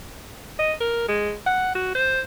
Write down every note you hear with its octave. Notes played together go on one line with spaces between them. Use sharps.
D#5
A#4
G#3
F#5
F#4
C5